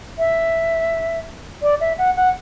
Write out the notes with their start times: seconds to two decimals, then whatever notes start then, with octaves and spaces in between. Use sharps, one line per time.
0.18 E5
1.62 D5
1.80 E5
1.98 F#5
2.16 F#5